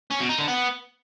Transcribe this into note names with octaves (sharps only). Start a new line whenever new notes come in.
C#4
B2
D#4
D3
B3